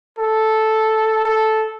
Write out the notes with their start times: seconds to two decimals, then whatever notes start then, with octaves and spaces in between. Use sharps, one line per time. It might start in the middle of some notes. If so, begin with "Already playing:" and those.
0.19 A4
1.25 A4